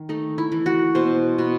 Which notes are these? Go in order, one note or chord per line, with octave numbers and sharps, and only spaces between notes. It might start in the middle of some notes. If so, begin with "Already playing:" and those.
Already playing: D#3
A3 D#4
E4
E3
F#4
B2 C5
B2